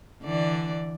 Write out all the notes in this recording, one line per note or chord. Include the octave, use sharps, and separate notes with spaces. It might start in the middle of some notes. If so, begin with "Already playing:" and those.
D3 E3 D5